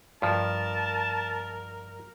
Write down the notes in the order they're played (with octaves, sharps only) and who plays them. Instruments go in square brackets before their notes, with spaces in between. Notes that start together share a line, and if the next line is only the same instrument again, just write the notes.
[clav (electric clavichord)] G2 F3 [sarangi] A#4 [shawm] A5